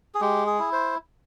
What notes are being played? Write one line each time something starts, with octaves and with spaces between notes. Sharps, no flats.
G#4
G#3 G4
G#4
E4
C5